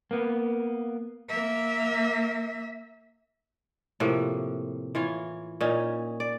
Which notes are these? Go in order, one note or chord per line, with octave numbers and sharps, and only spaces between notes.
A#3 B3
A#3 E5
A2 C3 F3 A#3
E3 F4 C#5
A#2 C#4 D#4
D5